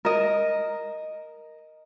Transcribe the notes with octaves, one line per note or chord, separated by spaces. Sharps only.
A#4 D#5